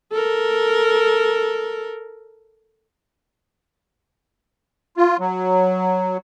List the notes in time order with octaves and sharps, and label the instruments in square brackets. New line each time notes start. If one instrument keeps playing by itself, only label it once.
[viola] A4 A#4
[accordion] F4
F#3